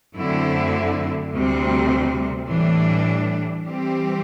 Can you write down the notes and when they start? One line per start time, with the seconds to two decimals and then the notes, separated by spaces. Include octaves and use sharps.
0.16 F#2 D3 A3 C4 E4
1.32 D2 C3 G3 C4
2.49 A2 E3 G3 D4
3.66 E3 G3 C4 G4